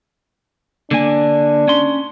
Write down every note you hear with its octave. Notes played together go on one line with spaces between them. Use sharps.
D3 A#3 D4 G#5
C#4 C6